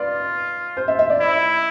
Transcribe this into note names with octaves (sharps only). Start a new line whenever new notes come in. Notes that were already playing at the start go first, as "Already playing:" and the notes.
Already playing: F4 B4 D5
C5
E5
E5
D5
E4